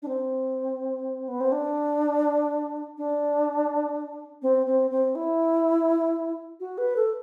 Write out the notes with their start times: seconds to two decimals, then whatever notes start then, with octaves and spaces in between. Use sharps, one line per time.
0.02 D4
0.08 C4
1.28 B3
1.41 C4
1.52 D4
2.97 D4
4.42 C4
4.66 C4
4.91 C4
5.15 E4
6.60 F#4
6.78 B4
6.96 A4